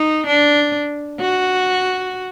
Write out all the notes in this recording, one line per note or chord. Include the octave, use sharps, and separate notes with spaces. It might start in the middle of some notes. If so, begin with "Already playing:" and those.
Already playing: D#4
D4
F#4